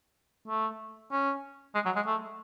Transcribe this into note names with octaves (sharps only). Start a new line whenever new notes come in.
A3
C#4
G#3
F#3
G#3
A3